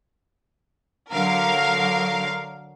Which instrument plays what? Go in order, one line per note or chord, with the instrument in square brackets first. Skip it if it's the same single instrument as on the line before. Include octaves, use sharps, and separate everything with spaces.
[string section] D3 F#3 A#4 F5